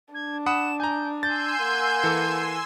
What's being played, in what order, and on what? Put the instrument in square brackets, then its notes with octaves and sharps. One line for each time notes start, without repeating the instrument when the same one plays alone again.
[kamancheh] D4 [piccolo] G#6
[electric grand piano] F#5 B5 D#6 [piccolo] E7
[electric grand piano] G#5 A#5 [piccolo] G6
[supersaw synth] G#5 C6 E6 [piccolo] G6 [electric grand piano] A6
[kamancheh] A#3 F#5
[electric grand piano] E3 A4